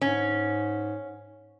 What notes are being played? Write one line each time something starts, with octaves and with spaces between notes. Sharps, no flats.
G#2 C#4